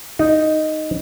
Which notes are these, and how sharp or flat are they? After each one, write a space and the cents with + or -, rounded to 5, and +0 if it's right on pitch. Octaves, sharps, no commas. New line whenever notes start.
D#4 +0 D5 +35